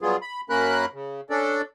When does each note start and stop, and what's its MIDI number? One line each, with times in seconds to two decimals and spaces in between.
0.01 0.17 54
0.01 0.17 55
0.01 0.17 59
0.01 0.17 65
0.01 0.17 68
0.22 0.41 83
0.50 0.86 42
0.50 0.86 58
0.50 0.86 61
0.50 0.86 70
0.50 0.86 83
0.50 0.86 90
0.93 1.21 49
1.30 1.62 61
1.30 1.62 62
1.30 1.62 69
1.30 1.62 74